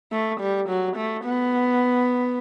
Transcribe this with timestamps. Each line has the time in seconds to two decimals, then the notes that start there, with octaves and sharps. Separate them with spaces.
0.12 A3
0.40 G3
0.69 F#3
0.97 A3
1.24 B3